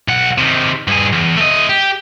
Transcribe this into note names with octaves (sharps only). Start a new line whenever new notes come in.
B1 F#5
C3 D#3
G2 G#4
E2
A3 D#5
G4